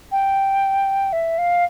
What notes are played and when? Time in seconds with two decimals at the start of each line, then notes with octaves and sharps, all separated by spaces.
0.12 G5
1.13 E5
1.38 F5